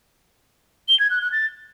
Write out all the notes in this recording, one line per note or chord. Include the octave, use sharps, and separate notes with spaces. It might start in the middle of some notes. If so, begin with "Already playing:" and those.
G7
G#6
F#6
F#6
A6